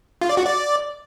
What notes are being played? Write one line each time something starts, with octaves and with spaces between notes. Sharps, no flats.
F4
D5
F#4
D5